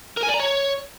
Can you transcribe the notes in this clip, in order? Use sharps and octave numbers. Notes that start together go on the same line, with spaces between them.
A#4
G#5
D5
A#5
C#5